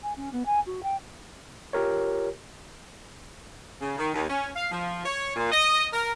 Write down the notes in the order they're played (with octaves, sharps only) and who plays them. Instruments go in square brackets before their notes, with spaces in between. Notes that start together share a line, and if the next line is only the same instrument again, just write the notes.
[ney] G#5
C#4
B3
G#5
F#4
G5
[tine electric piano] F4 G4 A#4 C#5
[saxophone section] C#3
D#3
D#2
C#4
F5
F3
C#5
A#2
D#5
A#4